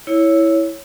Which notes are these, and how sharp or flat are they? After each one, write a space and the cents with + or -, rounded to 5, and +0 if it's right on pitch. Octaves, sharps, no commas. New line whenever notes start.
E4 -5 C#5 +5